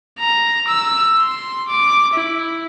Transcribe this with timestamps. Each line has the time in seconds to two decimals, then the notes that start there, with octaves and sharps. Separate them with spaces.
0.19 A#5
0.68 E6
1.20 C6
1.68 D6
2.14 E4